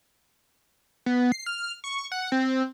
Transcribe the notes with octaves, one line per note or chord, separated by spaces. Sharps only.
B3
C7
F6
C#6
F#5
C4